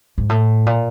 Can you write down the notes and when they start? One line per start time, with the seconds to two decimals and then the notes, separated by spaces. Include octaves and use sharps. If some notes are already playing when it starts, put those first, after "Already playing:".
0.18 G#2
0.29 A2
0.66 A#2